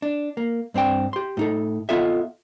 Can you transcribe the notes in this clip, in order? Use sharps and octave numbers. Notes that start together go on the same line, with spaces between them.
D4
A#3
G2 C4 D4 G5
G4 C6
A2 D#4 A4
B3 F4 A4 D#5 E5